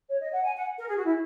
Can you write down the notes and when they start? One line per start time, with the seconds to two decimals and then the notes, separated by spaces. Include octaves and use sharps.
0.09 C#5
0.21 D#5
0.32 F#5
0.44 G#5
0.56 F#5
0.79 A#4
0.87 G#4
0.97 F#4
1.05 E4